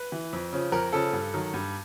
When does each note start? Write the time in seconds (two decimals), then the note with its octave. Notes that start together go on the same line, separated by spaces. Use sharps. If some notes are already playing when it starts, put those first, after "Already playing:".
Already playing: B4
0.12 E3
0.33 F2
0.53 C#3 F3
0.72 F2 A#4
0.93 C#3 F3 A4
1.13 G2
1.34 D#3 F#3
1.54 G2